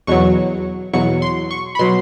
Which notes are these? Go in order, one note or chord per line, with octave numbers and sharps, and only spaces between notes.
E2 B2 F#3 C#6
E2 B2 F#3 C#6
C6
C#6
B5
B2 F#3 C6